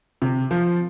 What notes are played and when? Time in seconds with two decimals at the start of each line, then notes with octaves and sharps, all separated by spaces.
0.22 C3
0.51 F3